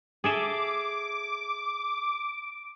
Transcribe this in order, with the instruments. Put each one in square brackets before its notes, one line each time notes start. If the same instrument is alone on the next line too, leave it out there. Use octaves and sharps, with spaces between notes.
[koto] G#4 A4 E5 [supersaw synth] D6